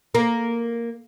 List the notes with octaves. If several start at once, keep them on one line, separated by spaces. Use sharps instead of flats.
A#3